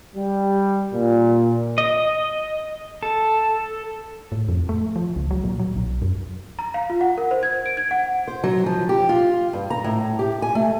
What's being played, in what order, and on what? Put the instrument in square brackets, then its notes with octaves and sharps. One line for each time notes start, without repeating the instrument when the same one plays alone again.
[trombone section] G3
A#2
[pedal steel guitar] D#5
A4
[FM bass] A2
F2
A3
F3
C#2
F#3
A#2
F#3
B1
F#2
[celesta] A#5
F5
F4
F#5
A#4
C5
G#6
D7
G#6
F#5
[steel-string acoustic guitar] C5
F#3
F3
G4
F4
G2
A#5
A2
G4
G#5
A3